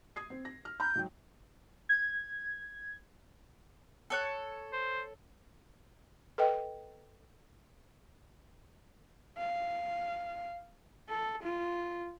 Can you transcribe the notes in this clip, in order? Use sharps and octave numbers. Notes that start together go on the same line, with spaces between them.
D#6 G#6 C7
C4
A#6
F6
A#5 B5 F6 G6
G#2 F#3 G5
G#6
A4 C#5 F#6
C5
A4 B4 D#5 G5
F5
A4
F4